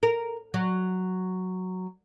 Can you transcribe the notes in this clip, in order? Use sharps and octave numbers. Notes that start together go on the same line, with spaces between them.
A#4
F#3